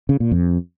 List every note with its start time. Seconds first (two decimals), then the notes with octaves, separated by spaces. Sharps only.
0.09 C#3
0.20 A#2
0.31 F2